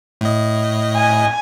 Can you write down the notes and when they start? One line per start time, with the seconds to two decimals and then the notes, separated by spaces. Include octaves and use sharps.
0.21 A2 D#5
0.96 G#5